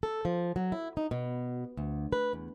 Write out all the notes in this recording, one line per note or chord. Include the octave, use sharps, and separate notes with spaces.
A4
F3
F#3
E4
D#4
B2
D2
B4
E2